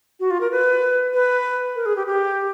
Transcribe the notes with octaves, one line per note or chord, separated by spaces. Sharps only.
F#4
F4
A#4
B4
B4
A#4
G#4
G4
G4